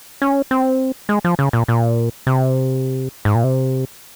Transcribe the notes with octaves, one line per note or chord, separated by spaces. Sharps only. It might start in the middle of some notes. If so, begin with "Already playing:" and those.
C#4
C4
G#3
F3
C#3
A#2
A#2
C3
G#2
A#2
C3